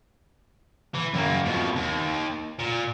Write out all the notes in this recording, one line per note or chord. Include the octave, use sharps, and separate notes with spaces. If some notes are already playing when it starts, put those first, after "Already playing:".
E3
F#2 A#3
F2 B2
D#2
A#2